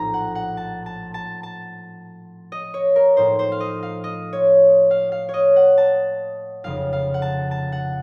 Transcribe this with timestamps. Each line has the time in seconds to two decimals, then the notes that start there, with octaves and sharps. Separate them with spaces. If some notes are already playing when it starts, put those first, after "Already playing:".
Already playing: A#1 A2 F3 C4 D#4 A#5
0.14 F#5
0.35 F#5
0.57 A5
0.86 A5
1.14 A5
1.43 A5
2.52 D#5
2.74 C#5
2.96 A#4
3.17 A2 F3 A#3 D#4 C5
3.39 C5
3.52 F5
3.60 D#5
3.83 F5
4.04 D#5
4.33 C#5
4.91 F5
5.12 F5
5.29 C#5
5.34 D#5
5.56 F#5
5.78 A5
6.64 F1 F2 C#3 F5
6.93 F5
7.14 F#5
7.22 A5
7.51 A5
7.72 F#5